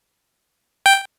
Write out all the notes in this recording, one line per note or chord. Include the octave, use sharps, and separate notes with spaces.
G5